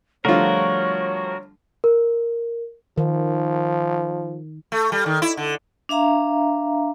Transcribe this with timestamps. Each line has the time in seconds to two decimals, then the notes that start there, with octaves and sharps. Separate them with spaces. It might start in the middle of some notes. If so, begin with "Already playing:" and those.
0.25 D3 F3 G3 A3 F4 F#4 A#4 C#5
1.84 A#4
2.98 D#3 F3
4.72 A3
4.92 G3
5.06 D#3
5.22 E4
5.37 D3
5.89 D4 E5 F5 A#5